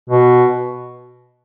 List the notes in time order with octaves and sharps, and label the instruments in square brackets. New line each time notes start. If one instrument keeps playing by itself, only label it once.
[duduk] B2